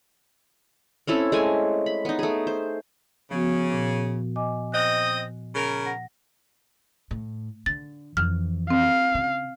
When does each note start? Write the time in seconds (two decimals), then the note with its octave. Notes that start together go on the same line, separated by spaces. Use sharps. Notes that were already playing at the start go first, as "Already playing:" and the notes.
1.07 C4 C#4 E4 A4
1.32 G#3 A3 G#5
1.86 B5
2.05 B3 D#4
2.19 A3 G#4
2.47 C5
3.31 C#3 F3 B3 F#4
3.72 A#2
4.36 D#5 G#5 D6
4.72 C4 D#5 F#6
5.55 C#3 A#4
5.86 F#5 A#6
7.11 A2
7.66 D3 A6
8.17 F2 E3 F6
8.70 C4 F5
9.15 C#3